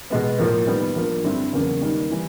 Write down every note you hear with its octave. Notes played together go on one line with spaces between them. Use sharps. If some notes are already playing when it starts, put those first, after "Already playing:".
B2 G#3 B3
A2 F3 A#3
D#3 G3 B3
F3 A#3 D4
G2 D3 G3 C4 E4
E2 C#3 F#3 A#3 C#4
D#3 G3 A#3
E3 G3